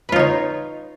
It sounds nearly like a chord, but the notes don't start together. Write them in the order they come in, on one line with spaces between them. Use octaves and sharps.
B4 F4 D#4 C#5